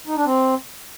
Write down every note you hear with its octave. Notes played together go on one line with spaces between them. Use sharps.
D#4
D4
C4